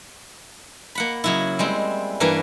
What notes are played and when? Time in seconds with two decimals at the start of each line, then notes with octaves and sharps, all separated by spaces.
0.95 A#3 F#5 B5
1.24 C#3 F#3 E4
1.59 G3 G#3 C4
2.20 G2 E3 A#3 A#4 E5